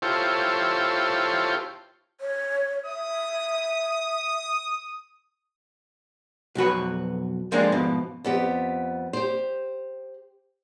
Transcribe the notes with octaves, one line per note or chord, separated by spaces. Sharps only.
E4 F4 G4 A4 C5 C#5
C#5
E5 D#6
B1 F2 F#4 B4
F3 G#3 A#3 C4 D4
G#2 B2 F3
F2 B3 G4
G4 C5